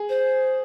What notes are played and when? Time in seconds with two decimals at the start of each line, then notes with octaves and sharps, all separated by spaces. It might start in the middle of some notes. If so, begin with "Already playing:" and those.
Already playing: G#4
0.09 C5